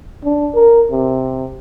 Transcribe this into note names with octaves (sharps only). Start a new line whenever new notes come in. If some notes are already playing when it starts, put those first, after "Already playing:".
D4
A#4
C3